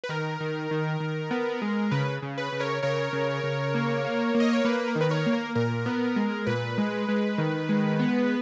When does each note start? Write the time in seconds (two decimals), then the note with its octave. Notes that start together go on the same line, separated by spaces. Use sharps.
0.04 B4
0.09 D#3 A#4
0.41 D#3
0.71 D#3
1.00 D#3
1.31 B3
1.62 G#3
1.91 C#3 B4
2.22 C#3
2.38 B4
2.53 C#3
2.59 A#4 C#5
2.83 C#3 A#4 C#5
3.13 C#3
3.44 C#3
3.74 A#3
4.05 A#3
4.35 A#3
4.40 D#5
4.53 C#5
4.65 A#3 B4
4.88 A#4
4.95 D#3
5.01 B4
5.11 A#4 C#5
5.26 A#3
5.33 A#4
5.55 A#2 A#4
5.86 B3
6.16 G#3
6.47 A#2 B4
6.78 G#3
7.08 G#3
7.38 D#3
7.69 G#3
8.00 B3